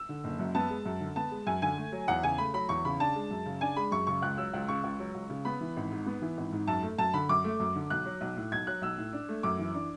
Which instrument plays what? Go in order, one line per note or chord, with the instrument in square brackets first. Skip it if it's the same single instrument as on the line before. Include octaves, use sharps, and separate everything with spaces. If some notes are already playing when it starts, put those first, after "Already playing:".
Already playing: [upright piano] E6
D3
F#1
F#2
B3 A5
G#3
F#2
D3
B3 A5
G#3
F#2 G#5
D3 G#5
A3
F#3
E2 F#5
C#3 G#5
A3 B5
F#3 B5
E2 C#6
C#3 B5
D4 A5
G#3
F#2
C#3
D4 G#5
G#3 B5
F#2 C#6
C#3 C#6
C#2 F#6
F#3 E6
C#2
C#3 C#6
C#2
F#3
C#2
C#3
B3 B5
E3
G#1
G#2
B3
E3
G#1
G#2
F#2 A5
A3
F#2 A5
D3 B5
F#2 D6
A3
F#2
D3
B1 F#6
F#3
B1
A2
B1 G#6
F#3 F#6
B1 E6
A2
D4
A3
F#2 D6
E3
D4